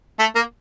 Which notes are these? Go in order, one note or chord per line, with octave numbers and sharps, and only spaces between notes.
A3
A#3